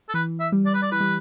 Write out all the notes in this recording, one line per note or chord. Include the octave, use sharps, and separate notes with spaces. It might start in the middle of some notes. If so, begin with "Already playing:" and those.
A4
E3 B4
E5
G3
D5
B4
D5
E3 B4
G3